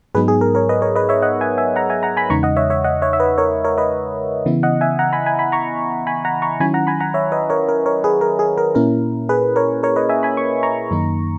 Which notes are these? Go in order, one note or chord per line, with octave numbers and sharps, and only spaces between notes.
G#2 F#3 B3 D#4 G#4 B4
G#4
A#4
A#4 C#5
B4 D#5
A#4 C#5
B4 D#5
C#5 E5
D#5 F#5
E5 G#5
E5 G#5
F#5 A#5
E5 G#5
F#5 A#5
G#5 B5
E2 C#3 G#3 D#4 A#5 C#6
D#5 F#5
C#5 E5
C#5 E5
D#5 F#5
C#5 E5
E5
B4 D#5
A#4 C#5
A#4 C#5
B4 D#5
C#3 E3 B3 E4
D#5 F#5
E5 G#5
F#5 A#5
G#5 B5
G#5 B5
G#5 B5
A#5 C#6
G#5 B5
F#5 A#5
A#5 C#6
D#3 F#3 C#4 E4 G#5 B5
F#5 A#5
G#5 B5
F#5 A#5
C#5 E5
B4 D#5
A#4 C#5
A#4
A#4 C#5
G#4 B4
A#4
G#4
A#4
A#2 A#3 C#4 E4 A#4
G#4 B4
A#4 C#5
A#4 C#5
B4 D#5
E5 G#5
G#5 B5
C#6
A#5 C#6
F#2 D#3 A#3 D#4